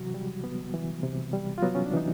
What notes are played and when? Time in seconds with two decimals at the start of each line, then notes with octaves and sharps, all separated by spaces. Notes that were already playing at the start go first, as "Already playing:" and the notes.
Already playing: C3 E3 F#3 F#4
0.14 G3
0.44 B3
0.73 E3
1.03 C3
1.33 G3
1.58 F4
1.63 F#3 B3 F#4
1.75 C#4
1.86 D4
1.93 E3 D#4